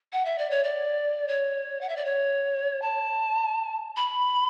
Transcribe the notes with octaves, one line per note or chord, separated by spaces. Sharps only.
F#5
E5
D5
C#5
D5
C#5
F#5
E5
D5
C#5
A5
B5